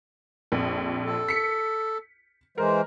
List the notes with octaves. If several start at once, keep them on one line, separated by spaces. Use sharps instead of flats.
A#1 F2
A4
B6 C#7
E3 G#3 A#4 C5